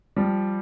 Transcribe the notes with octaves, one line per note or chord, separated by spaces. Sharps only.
F3 G3